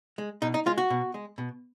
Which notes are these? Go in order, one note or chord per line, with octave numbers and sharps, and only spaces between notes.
G#3
B2 D#4
D#4
G#3 F4
F#4
B2
G#3
B2